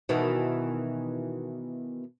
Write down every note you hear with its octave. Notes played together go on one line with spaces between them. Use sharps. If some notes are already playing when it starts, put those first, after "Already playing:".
B2 D#3 E3